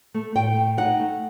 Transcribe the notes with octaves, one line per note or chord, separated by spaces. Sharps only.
A3
A2 G5
A2
D#4 F#5
A3